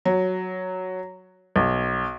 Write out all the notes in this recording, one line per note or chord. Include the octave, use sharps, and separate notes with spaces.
F#3
B1